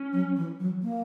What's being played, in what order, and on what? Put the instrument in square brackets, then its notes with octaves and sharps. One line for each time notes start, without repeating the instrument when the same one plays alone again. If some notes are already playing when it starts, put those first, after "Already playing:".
Already playing: [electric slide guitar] C#4
[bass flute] F#3
E3
F#3
A#3